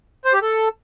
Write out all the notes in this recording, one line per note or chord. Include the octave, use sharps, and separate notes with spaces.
C5
G4
A4